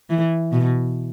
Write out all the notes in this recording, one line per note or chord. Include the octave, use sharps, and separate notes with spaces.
E3
B2